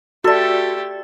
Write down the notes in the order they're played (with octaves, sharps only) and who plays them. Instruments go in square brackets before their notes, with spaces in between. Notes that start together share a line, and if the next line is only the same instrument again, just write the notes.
[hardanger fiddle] A3 G4 [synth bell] F#4 D5 [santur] A4 A5